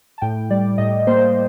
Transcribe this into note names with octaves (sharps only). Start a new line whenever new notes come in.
A5
A2 G5
G3 D5
A2 D#5
A#3 C5